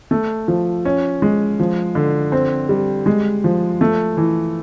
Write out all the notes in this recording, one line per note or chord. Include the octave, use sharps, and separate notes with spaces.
A3
F3
C#4
G#3
F3
D3
C4
G3
G#3
F3
A3
E3